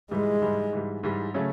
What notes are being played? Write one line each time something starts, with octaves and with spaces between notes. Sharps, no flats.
G#2 E3 G3 G#3
G#2 E3 G3
G#2 E3 G3
G#2 E3 G3
C#3 F#3 A3 C#4